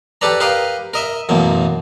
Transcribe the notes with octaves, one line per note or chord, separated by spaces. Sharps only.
G4 A4 B4 D5 A#5
G4 A#4 B4 D#5 F5
A#4 D#5 E5
A1 F#2 B2 A#3